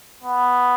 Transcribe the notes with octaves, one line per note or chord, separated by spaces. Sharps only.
B3